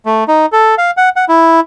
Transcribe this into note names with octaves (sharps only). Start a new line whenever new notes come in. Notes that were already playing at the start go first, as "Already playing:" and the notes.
A3
D#4
A4
F5
F#5
F#5
E4